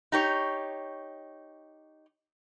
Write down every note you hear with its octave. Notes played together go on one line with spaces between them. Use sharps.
D#4 G4 C#5